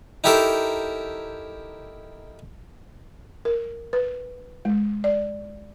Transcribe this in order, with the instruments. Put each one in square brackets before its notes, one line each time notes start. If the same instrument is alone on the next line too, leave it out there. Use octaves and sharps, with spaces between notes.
[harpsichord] D#4 E4 G4 A4 A#4 C5
[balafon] A#4
B4
G#3
D5